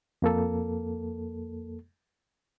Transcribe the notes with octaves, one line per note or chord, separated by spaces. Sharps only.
F2 A#3 A4